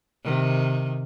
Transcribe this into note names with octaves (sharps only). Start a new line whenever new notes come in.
C3 D#3